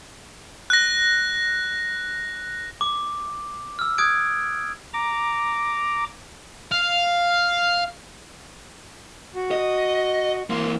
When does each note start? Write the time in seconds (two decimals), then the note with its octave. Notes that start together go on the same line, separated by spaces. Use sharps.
0.70 F#6 A#6
2.81 D6
3.79 E6 F6
3.98 D#6 F#6 G#6 D7
4.93 A#5 D6
6.72 F5
9.35 F#4
9.51 D#5
10.50 E3 A#3 C6